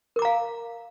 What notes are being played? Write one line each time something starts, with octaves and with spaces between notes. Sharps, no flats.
A#4 F5 A#5 D6